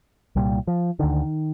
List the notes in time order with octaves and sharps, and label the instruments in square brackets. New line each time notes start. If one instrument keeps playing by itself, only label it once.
[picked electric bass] C2 A#2 G3
F3
D2 D3 D#3